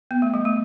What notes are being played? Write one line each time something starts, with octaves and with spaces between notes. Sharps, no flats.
B3
A3
G3
A3